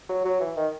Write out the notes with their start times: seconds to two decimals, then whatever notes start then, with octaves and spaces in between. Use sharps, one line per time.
0.09 F#3
0.25 F#3
0.40 E3
0.56 D#3